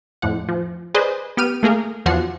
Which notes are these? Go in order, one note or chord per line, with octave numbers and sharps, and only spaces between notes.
F2 A2 F#5
F3
G#4 B4 C5 D5 D#5
B3 G4 F6 D#7
A3 A#3 G#4 A#4
E2 F3 F#4 F#5 C7